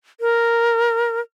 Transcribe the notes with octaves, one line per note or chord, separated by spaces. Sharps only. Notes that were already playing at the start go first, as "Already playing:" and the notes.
A#4